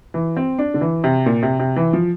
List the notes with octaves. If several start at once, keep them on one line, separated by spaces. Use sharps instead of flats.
E3
C4
D4
D3
E3
C3
A#2
C3
C3
E3
F3